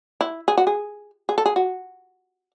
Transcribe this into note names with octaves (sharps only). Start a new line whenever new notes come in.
E4
G#4
F#4
G#4
G#4
A4
G#4
F#4